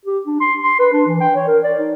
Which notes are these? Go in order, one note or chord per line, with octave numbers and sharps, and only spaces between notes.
G4
D4
C6
C6
B4
D4
E3
G5
C#5
A#4
D5
D#4